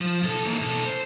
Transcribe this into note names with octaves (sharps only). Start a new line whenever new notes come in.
F3
B2 A4
E3 A#3
B2 A4
C5